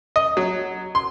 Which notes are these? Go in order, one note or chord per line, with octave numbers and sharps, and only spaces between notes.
D#5
F#3
C6